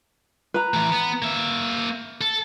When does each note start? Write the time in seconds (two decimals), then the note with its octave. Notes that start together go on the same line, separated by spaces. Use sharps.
0.54 B4 A#5
0.74 E3 A3
0.93 B3
1.22 A#3 E5
2.21 A4